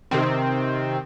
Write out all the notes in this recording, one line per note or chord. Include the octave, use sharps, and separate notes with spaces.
C3 D#3 C4